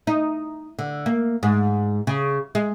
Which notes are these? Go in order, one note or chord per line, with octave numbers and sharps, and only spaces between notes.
D#4
D3
A#3
G#2
C#3
G#3